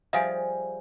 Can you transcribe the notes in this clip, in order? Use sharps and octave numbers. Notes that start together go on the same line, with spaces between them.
F3 G3 G#4 E5 F5 G#5